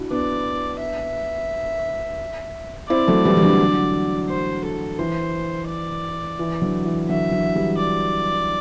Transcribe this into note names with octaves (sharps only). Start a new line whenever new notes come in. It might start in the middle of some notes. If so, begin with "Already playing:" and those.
Already playing: D4 E4 F#4
B3 D4 D5
E5
C4 E4 D5
F#3 A3
E3 G3
G3
D3 F#3
C5
A4
E3 C5
D5
E3
D3 F#3
E3
D3 F#3 E5
D3 F#3
E3 G3
D5